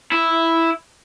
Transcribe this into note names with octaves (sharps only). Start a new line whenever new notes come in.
E4